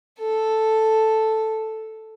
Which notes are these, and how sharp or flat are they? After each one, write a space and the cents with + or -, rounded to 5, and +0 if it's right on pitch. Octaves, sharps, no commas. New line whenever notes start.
A4 +0